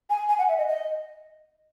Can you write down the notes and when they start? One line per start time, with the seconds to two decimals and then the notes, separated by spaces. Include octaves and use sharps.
0.10 G#5
0.29 G#5
0.38 F#5
0.49 E5
0.58 D#5
0.68 D#5